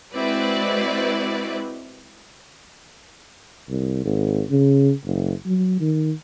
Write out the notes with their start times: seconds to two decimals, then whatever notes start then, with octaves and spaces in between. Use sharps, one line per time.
0.13 G#3 C4 E4 F#4 B4 D5
3.69 C2
4.05 G#1
4.51 C#3
5.05 F#1
5.46 F#3
5.80 D#3